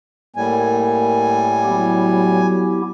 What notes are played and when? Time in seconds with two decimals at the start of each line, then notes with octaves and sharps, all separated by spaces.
0.36 A2 G3 A#3 G#5
1.64 F#3 B3 E4 G4